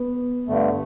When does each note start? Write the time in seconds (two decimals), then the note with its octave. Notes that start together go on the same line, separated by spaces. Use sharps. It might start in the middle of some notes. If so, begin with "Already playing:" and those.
Already playing: B3
0.48 G2 D3 A3